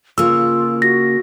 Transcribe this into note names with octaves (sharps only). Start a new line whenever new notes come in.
C#3 A#3 F4 E6
F#4 A#6